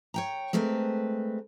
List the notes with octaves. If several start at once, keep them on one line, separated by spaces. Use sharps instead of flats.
C#5 G5 A#5
G#3 A3 C4 A#4 B4